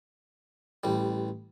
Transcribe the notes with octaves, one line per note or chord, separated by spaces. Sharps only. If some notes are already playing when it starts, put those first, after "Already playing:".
A1 G3